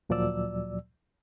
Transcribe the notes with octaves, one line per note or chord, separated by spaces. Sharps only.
D2 A#2 F3 F#3 D5 E6